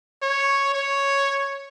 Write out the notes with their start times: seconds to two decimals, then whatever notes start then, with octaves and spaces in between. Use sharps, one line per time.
0.22 C#5
0.74 C#5